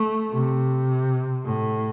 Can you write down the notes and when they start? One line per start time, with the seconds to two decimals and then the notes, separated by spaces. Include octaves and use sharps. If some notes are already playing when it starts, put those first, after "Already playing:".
Already playing: A3
0.33 C3
1.45 A2